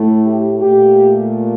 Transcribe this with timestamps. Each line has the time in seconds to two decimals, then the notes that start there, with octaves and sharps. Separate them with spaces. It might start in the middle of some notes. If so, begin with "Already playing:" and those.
Already playing: A2 A3
0.26 G4
0.61 A3 G4
0.66 A#2